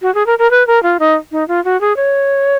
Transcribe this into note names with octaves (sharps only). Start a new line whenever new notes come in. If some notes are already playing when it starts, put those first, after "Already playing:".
F#4
G#4
A#4
A#4
B4
A#4
F4
D#4
D#4
F4
F#4
G#4
C#5